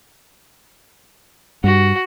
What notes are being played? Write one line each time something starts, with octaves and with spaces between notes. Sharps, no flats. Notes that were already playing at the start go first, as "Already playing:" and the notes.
G2 F#4